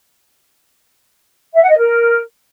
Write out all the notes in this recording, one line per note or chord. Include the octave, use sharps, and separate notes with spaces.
E5
F#5
D#5
A#4